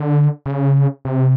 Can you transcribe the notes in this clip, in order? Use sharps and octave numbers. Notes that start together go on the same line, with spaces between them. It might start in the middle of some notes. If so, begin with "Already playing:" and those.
Already playing: D3
C#3
C3